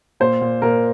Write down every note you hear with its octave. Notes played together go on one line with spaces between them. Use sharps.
A#2 C5
A#2
A#2 A#4